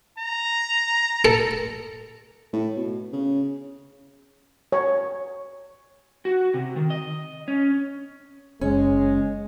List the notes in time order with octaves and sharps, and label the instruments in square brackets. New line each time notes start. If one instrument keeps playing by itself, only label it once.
[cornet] A#5
[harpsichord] A4
[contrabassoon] A2
B2
C#3
[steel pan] C#5
[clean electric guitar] F#4
C3
D#3
D#5
C#4
[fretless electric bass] F#1 [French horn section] G#3 [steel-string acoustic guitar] C#4